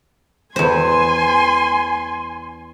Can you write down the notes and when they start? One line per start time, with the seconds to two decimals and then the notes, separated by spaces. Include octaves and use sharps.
0.56 E2 C5 G#5 C6